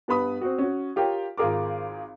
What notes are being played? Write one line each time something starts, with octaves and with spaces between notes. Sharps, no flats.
G2 B3 B4 B5 D#6
C4 F#4
C#4 F#4
F4 G4 A#4 C#5 G5
G#1 F4 G#4 A#4 D6